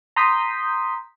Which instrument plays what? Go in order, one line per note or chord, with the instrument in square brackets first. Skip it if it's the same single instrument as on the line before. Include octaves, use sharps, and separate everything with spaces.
[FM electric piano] A#5 C6 D#6 G6 B6